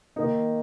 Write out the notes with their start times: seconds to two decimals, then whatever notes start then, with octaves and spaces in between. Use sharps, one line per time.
0.16 D#3 A#3 D#4